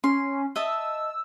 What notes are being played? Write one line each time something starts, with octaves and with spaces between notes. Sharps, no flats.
C#4 C6
D#5 E5 A5 E6